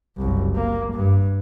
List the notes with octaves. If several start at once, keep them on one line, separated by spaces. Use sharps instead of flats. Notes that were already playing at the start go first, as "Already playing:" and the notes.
F#1 C2
A#3
G2